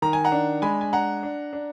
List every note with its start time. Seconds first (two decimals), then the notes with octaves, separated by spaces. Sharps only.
0.02 D#3 A#5
0.13 G#5
0.24 F#5 A#5
0.32 D4
0.62 G#3 G#5 B5
0.81 G#5
0.93 D4 F#5 A#5
1.23 D4
1.53 D4